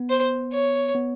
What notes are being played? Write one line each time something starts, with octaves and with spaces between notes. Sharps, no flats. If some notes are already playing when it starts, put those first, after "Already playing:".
Already playing: B3
C5
C#5
B3